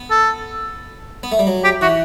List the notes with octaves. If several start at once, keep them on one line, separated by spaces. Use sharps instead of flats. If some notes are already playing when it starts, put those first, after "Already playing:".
Already playing: B3
A4
B3
A3
G3
F#3
G4
E3 F#4